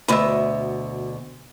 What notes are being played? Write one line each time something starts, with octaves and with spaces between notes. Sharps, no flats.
D2 B2 B4 D#5 E5